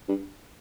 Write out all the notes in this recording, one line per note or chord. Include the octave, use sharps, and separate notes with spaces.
G2